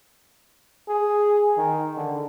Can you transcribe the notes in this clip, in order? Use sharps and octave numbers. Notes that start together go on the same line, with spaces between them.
G#4
D#3
D3